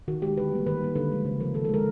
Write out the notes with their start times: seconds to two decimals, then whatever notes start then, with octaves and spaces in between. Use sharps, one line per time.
0.08 D#3 F#4
0.22 G#3 G4
0.37 D3 B4
0.52 G3 A#3
0.67 D#3 B4
0.81 G3 A#3
0.95 D3 B4
1.11 F3 G#3
1.25 C#3 C5
1.40 F3 A#4
1.45 A#3
1.54 D#3 A4
1.65 A4
1.69 G#3 A#4